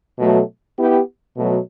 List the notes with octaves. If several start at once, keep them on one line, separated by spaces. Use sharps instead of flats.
B2 F#3 A3
B3 E4 G4
B2 F#3 A3